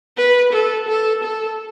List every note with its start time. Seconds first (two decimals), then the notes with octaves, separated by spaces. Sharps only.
0.17 B4
0.53 A4
0.88 A4
1.23 A4